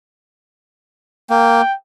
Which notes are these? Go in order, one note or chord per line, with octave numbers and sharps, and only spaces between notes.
A#3 G5